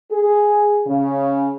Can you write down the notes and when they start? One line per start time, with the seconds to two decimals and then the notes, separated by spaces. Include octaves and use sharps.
0.11 G#4
0.87 C#3